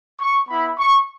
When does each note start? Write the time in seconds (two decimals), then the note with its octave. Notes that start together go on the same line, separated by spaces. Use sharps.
0.21 C#6
0.49 B3 E4 B5
0.79 C#6